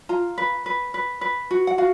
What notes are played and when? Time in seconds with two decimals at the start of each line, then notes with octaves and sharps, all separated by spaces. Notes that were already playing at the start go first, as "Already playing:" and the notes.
0.09 F4 A#5
0.38 B4
0.66 B4
0.94 B4
1.21 B4
1.51 F#4
1.67 F#5
1.78 F#4 F5